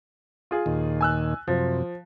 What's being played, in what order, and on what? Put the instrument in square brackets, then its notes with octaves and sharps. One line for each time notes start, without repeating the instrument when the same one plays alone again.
[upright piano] F4 G#4
[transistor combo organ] D#2 A#2 D#3
[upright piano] G#5 E6 F#6
[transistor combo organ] F#2 C3 [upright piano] F3